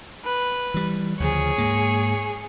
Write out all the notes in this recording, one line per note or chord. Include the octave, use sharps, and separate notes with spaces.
B4
E3 G3
D2 C#3 F3 G#4 C#5
G#2 A#3